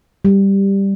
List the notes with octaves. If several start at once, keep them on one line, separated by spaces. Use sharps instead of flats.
G3